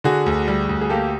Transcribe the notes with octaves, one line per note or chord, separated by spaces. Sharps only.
D3 F#4 G#4
D2
G3
D2
G#4
A#3 G4 A4